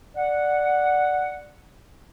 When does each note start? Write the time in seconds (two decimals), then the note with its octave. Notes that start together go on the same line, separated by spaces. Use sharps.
0.17 D5 F#5